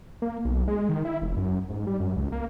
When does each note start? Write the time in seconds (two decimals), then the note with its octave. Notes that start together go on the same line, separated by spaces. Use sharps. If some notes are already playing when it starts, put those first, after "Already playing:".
0.22 A#3
0.45 B1
0.68 G#3
0.89 D#3
1.05 E4
1.22 F1
1.37 F#2
1.70 G#2
1.87 G3
2.00 F#2
2.16 C#2
2.32 A#3